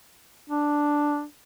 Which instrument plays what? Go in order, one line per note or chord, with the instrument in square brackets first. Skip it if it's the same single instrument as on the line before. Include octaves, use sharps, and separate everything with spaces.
[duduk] D4